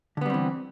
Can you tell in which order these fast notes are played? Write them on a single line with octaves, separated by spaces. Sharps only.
D3 B3 G3 C4 E3